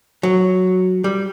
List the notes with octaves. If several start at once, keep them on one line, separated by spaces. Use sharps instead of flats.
F#3
G3